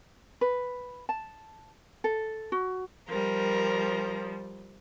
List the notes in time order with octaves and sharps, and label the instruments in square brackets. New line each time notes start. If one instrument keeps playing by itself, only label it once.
[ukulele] B4
A5
A4
F#4
[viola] F3 G3 [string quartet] A#4